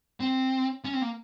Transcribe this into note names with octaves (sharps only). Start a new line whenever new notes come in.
C4
C#4
C4
A#3